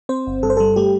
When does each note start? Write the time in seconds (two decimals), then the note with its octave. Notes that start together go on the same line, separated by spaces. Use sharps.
0.09 C4 C5
0.27 G1
0.43 G2 A4
0.50 C5
0.57 G3 A4
0.76 A3 G4